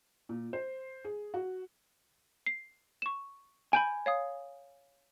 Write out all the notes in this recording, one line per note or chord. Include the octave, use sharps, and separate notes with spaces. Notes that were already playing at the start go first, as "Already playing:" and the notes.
A#2
C5
G#4
F#4
C7
C#6 E7
G#5 B5 G6 D7
C#5 F5 D#6